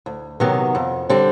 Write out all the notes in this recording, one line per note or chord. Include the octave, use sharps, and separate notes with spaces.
D2
C3 D#3 F#3 B3
F2
D3 G3 C4